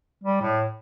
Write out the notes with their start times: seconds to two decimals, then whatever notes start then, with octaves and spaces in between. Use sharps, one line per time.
0.23 G3
0.41 A2